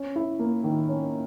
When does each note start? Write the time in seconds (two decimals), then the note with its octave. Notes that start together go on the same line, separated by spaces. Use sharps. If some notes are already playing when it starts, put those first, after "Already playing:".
Already playing: C#4
0.16 E4
0.39 A#3
0.64 D#3
0.89 C#4